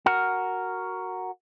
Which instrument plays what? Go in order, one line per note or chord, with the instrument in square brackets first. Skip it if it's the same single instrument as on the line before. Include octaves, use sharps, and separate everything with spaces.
[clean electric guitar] F#4 A#4